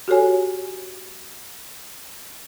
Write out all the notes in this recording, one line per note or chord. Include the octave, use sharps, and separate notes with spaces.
F#4 G4 A4 C#5 G#5